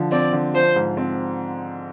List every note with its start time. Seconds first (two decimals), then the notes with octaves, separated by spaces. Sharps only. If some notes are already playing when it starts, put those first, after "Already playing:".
Already playing: D3 F3
0.12 C4 D5
0.33 D3
0.53 F3 C5
0.76 G#2
0.97 C4